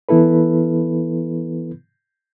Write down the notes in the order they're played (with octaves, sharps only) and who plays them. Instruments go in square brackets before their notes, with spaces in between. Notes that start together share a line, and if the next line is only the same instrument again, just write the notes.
[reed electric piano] E3 B3 E4 A4 B4